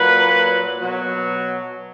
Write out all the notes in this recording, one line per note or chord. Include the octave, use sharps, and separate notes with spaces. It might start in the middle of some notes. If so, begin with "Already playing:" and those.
Already playing: A#2 F#3 B4
B2 F#3